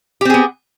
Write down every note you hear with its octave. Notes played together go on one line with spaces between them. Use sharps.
B3 C4 G4 G#4